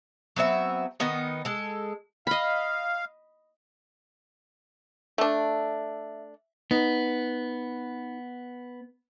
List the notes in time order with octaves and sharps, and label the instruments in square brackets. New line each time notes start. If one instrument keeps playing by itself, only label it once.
[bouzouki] F#3 B3 C4 E5
D#3 B3 D#4
G#3 A4
[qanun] D#5 B5 [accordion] F5
[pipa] A3 D4 [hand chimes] E5
[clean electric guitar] B3 [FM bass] D#4